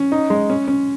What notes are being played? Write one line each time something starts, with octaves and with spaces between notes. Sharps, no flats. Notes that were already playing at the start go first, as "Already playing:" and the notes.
Already playing: C#4
D#4
G#3
C#4
C#4